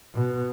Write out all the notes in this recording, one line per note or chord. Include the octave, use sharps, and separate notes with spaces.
B2